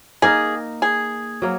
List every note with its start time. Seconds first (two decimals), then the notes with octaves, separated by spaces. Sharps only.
0.22 A#3 D#4 G#4 A#4
0.82 G#4
1.42 F#3 A#3